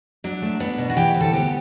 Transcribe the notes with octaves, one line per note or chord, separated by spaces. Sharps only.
F#3 D4
A3
B3 D4
B2
F#4
E3 G4
D2
A4
B3 G4